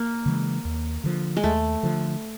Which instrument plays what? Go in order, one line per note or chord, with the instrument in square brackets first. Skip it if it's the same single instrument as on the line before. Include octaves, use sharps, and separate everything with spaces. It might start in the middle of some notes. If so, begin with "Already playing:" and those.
Already playing: [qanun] A#3
[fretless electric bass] C#3 E3 G#3
D#2
D3 F3
[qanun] G#3
[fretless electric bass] D#2 [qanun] A3
[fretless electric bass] D3 F3